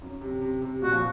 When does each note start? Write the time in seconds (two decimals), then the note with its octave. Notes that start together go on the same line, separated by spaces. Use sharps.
0.02 F#2
0.21 C3
0.41 C3
0.62 C3
0.82 A#2 F#4
0.92 F3